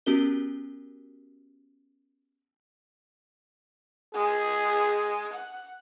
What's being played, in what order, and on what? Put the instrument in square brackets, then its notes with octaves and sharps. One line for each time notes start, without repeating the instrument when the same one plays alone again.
[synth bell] B3 C#4 F#4 G4 A#4 G7
[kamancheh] G#3 [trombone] G#4
[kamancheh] F#5